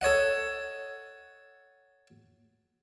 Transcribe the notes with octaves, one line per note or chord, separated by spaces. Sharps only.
A4 C#5 D#5 F#5